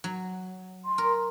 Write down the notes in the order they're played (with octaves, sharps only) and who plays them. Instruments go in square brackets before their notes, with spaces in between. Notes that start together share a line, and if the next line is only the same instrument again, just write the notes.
[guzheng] F#3
[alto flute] C6
[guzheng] A#4